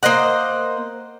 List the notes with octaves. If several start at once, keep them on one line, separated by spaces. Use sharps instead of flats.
A#3 C5 D#5 F#5